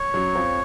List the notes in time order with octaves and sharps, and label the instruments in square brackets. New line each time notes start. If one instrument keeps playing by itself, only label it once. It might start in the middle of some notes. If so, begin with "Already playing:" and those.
Already playing: [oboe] C#5
[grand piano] F#2 F#3
F2 F3